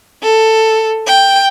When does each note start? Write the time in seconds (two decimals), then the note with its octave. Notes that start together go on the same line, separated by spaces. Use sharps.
0.23 A4
1.07 G5